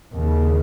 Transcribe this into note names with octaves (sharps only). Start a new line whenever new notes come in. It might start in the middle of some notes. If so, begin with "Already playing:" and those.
D#2 C#3